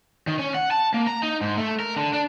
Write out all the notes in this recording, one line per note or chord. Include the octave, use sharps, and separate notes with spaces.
D#3
C#4
F#5
A5
A#3
A#5
D#4
G#2
A3
A#4
D3
D4